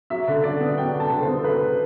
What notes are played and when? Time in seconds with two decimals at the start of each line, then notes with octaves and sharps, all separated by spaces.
0.10 F#3 E5
0.28 D3
0.44 D3 D5
0.60 B3
0.78 F#3 G5
0.94 D3
1.00 A5
1.11 D3
1.22 C5
1.28 B3
1.39 A4
1.44 F#3 B4
1.62 D3